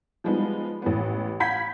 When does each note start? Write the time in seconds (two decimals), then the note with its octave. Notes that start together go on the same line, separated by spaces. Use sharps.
0.24 F3 G3 G#3 B3 D#4
0.82 A1 E3 B3
1.40 F5 F#5 B5 G6 G#6 B6